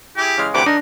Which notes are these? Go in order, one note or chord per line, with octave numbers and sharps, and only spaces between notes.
E4 G4 G#4 G5
C#3 E3 G#3 F6
D2 C3 E3 G4 B4 F#5 D6
D#3 D4 D#4 A#4